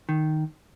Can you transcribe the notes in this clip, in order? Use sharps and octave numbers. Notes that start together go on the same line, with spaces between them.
D#3